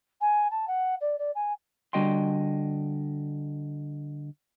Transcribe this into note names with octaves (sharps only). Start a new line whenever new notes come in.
G#5
A5
F#5
D5
D5
G#5
D3 G3 F#4 D#5 G5 C6